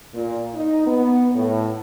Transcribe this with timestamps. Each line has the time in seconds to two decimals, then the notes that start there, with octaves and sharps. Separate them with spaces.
0.14 A#2
0.54 D#4
0.87 B3
1.35 A2